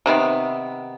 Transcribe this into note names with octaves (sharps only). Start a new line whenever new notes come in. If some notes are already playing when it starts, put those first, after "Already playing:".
C3 D#3 B3 C4